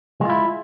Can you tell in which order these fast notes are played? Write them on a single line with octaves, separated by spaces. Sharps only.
G#3 F4 E4